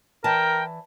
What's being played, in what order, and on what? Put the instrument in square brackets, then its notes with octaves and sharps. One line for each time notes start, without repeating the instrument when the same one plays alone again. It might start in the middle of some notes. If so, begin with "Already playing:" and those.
[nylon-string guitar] E3 D5 A5 [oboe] A#4 [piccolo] G5